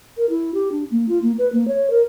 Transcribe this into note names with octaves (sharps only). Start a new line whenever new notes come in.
A#4
E4
G4
D4
A#3
F4
A#3
B4
A#3
C#5
A#4